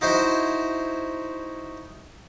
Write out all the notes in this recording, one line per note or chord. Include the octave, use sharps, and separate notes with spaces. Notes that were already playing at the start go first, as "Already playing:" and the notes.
D#4 E4 F#4 C5